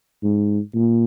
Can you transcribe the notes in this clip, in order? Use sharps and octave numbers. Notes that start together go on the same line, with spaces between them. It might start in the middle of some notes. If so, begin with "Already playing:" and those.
G#2
A#2